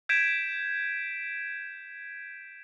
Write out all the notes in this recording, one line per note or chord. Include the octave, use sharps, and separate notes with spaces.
G6 G#6 B6 D7 E7